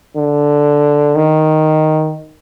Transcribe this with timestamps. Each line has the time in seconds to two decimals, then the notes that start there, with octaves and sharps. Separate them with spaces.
0.17 D3
1.16 D#3